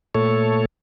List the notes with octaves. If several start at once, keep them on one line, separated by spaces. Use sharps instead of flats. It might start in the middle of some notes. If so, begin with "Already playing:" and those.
A#2 A3 A4 C#5